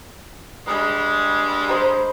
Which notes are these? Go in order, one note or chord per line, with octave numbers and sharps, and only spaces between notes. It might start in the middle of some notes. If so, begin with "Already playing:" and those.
G2 G3 G#3 B5
C5 B5 D#6